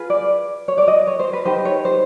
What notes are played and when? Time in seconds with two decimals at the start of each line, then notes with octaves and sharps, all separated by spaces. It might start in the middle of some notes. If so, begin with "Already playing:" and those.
Already playing: F4 G#4 B4
0.10 D5
0.68 C#5
0.78 D5
0.88 D#5
1.07 C#5
1.20 C5
1.33 B4
1.45 D#4 G4 B4 C5
1.65 C#5
1.85 C5